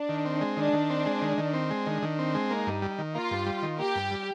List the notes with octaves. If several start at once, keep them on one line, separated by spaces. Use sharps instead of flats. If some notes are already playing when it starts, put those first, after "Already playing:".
Already playing: D4
D#3
C4
G#3
D#3 D4
D#3
C4
G#3
D#3
D#3
C4
G#3
D#3 D4
D#3
C4
G#3
A#3 D#4
G2
G3
D#3
A#3 F4
G2
G3
D#3
A#3 G4
G2
G3